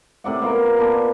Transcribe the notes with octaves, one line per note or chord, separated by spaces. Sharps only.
A2 C3 D5 F#5
B3 F4 A#4
A#2 B3 D4 G#5